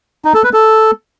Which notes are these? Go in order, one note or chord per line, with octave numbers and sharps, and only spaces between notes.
D#4
A4
B4
A4